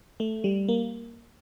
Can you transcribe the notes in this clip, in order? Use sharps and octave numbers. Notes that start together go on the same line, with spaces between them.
A3
G3
A#3